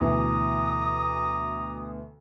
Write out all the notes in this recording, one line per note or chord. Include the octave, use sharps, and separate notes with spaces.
D2 B2 E3 A#5 D6 D#6